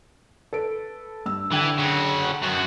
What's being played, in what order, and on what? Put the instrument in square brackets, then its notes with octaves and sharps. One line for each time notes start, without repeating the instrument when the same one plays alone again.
[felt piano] A4 B4 D7
G2 E6
[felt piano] D3 G5 G#6 [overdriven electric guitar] E3
[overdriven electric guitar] C#3 F#4
F#2 F#4